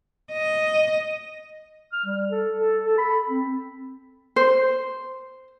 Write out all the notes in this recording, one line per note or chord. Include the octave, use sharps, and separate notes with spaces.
D#5
F6
G3
A4
A4
A4
B5
C4
C5